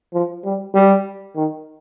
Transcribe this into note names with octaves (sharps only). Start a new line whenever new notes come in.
F3
G3
G3
D#3